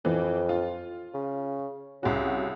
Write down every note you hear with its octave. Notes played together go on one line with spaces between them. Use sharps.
F2 E3
F4
C#3
C2 C#3 F#4